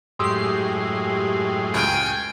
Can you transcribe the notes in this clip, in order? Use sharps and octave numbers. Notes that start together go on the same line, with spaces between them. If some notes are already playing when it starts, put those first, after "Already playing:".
F#2 A2 G#3 G4 C6 D#6 E6 C7
C#2 G5 G#5 F6